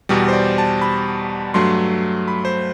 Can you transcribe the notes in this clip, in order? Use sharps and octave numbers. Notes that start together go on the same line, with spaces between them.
E2 B2 G3
C5
D5
A5
B5
G2 F#3 A3 C6
B5
C5